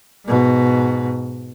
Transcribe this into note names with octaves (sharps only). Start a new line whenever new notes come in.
G#2 B2